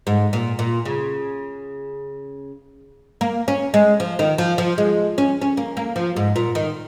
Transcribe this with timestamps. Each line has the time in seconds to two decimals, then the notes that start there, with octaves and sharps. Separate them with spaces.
0.07 G#2
0.33 A#2
0.59 A#2
0.85 C#3
3.21 A#3
3.48 C#4
3.74 G#3
4.00 F3
4.19 D#3
4.38 F3
4.58 F3
4.78 G#3
5.18 C#4
5.42 C#4
5.57 A#3
5.77 A#3
5.96 F3
6.16 G#2
6.36 A#2
6.55 D#3